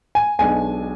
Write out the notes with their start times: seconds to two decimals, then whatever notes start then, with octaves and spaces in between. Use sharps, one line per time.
0.15 G#5
0.39 B1 B2 G#3 D4 G#5